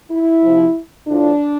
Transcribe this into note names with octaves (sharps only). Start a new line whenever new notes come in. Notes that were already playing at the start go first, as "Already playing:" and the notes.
E4
C3 F3
A2 F3 D4